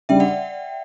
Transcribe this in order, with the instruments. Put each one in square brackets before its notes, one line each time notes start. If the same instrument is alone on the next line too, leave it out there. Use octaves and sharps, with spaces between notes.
[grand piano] C#3 G3 D4 [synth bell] E5 G5
[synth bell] D5 F#5